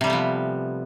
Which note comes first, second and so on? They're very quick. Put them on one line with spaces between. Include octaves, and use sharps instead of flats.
C3 G3 A3 B3 F3